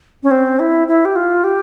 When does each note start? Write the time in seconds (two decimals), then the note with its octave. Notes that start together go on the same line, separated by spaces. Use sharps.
0.23 C#4
0.31 C4
0.59 E4
0.88 E4
1.05 G4
1.16 F4
1.44 G4